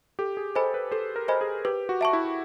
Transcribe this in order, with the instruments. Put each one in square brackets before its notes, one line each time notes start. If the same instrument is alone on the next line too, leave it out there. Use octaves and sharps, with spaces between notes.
[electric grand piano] G4 [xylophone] A4
[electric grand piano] G#4
[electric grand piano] A4 [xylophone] C5 D#5 G#5 B5
[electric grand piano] B4
[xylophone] A4 [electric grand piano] C5
[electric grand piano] A#4
[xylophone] C5 D#5 G#5 B5
[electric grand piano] G#4
[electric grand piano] G4 [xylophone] B4
[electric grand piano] F#4
[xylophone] E5 A5 C#6
[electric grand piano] E4